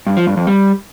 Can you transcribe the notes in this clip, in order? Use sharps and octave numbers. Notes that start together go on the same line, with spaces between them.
G2
F3
G2
F2
G3